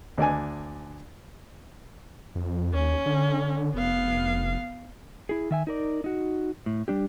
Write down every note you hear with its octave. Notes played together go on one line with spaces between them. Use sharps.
D2 D4 D5 G#5
F2
D#2 C#4
D3
F1 B3 F5
E4 G#4
D#3 E5 G#5
D#4 A#4 D5
D#4 F#4
A2
G3 D4 G4